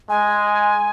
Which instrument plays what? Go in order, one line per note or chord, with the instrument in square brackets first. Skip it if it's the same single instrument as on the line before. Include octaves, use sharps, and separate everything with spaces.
[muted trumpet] G#3 [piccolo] G#5